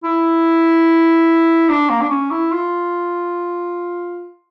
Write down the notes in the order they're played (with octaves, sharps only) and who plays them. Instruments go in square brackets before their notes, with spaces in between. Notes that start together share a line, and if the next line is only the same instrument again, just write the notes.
[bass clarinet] E4
D4
A#3
D4
C#4
E4
F4